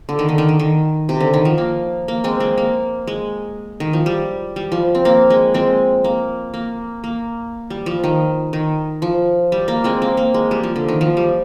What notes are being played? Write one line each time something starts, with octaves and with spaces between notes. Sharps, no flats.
D3
D#3
D3
D#3
D3
D#3
C3
D3
D#3
F3
A#3
A#3
G#3 C4
G#3 C4
A#3
G#3
D#3
F3
G3
G3
F3
C4
A#3
G#3
G#3 C4
A#3
A#3
A#3
G3
F3
D#3
D#3
F3
G3
A#3
G#3 C4
A#3
A#3
G#3
G3
F3
D3
D#3
F3
G3